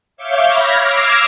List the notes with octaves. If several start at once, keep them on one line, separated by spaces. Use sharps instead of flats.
C#5 E5 F5 C#6 D6 G6
B5 F6 G#6 A#6 B6
D6 E6 F6 G#6 A#6 C7